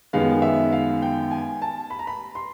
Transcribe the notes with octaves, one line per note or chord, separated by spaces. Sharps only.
F#2 D#3 G#3 B3 F5
E5
F5
G5
G#5
A5
B5
A#5
B5
C6